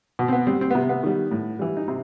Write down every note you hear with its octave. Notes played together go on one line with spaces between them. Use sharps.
B2
C4
B3
G3 C4
C4
C3 B3
B3
D#3 G3
A2
E3 G3
D#4
C3 C4